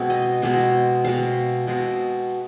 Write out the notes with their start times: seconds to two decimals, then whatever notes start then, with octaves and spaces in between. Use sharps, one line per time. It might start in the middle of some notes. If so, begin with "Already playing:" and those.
Already playing: B2 G#3 C4
0.10 D#5
0.42 B2 G#3 C4
1.05 B2 G#3 C4 F5
1.67 B2 G#3 C4